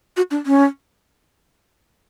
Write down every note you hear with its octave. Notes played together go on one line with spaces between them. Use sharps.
F#4
D4
C#4